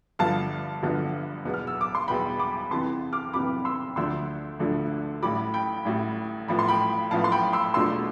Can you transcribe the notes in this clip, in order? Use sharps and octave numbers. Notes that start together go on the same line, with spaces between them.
G1 G2 D3 F3 B3 F5 A5
G1 G2 D3 F3 B3
E2 B2 B3
F6
E6
D6
C6
E2 B2 B3 G5 B5
B5 D6
F2 C3 E3 B3 A5 C6
D6 F6
F2 C3 E3 B3 B5 D6
C6 E6
D2 D3 F3 A3 D4 C6 E6
D2 D3 F3 A3 D4
A1 A2 G3 B5 D6
G5 B5
A1 A2 G3
A1 A2 F3 B3 B5
C6
G5 B5
A1 A2 F3 B3 F5 A5
C6
G5 B5
C6 E6
E2 B2 A3 D4 F4 C6 E6